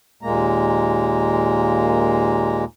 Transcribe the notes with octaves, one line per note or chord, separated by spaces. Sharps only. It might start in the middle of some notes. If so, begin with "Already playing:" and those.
D#2 A#2 G#3 A#3 A#5